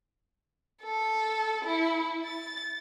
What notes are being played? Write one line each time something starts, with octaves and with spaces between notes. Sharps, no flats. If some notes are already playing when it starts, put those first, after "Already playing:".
A4
E4
A6